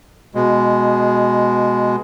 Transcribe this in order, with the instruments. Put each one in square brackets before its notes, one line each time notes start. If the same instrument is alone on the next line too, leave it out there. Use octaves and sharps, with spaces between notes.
[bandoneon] B2 G#3